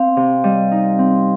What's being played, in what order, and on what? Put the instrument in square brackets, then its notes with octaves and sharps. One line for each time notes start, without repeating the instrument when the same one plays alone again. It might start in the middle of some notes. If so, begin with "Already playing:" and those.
Already playing: [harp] C4 [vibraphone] F5
[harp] C3
[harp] G3 [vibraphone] D#5
[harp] D#4
C4